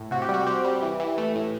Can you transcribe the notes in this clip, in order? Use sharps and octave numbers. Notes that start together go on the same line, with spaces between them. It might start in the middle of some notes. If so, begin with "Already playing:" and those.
Already playing: A2
C3 F#4
G4
G3
F#4
C4 G4
G3
E3
E3
A3
A2